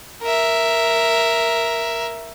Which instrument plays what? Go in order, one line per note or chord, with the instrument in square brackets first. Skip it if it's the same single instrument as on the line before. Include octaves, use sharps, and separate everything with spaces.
[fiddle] A#4 E5